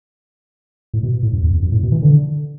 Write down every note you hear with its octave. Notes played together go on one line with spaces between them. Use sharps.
A2
B2
A2
F#2
E2
E2
F#2
A2
B2
E3
D3